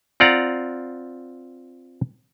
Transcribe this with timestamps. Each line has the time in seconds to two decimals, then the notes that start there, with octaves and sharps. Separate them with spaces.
0.20 C4 F4 D5 F#5 A#5